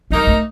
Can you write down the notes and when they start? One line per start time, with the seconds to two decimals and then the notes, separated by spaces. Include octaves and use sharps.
0.10 G3 A#3 D#4
0.27 A3